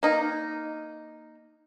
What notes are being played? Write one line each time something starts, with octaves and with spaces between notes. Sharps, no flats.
A#3 D#4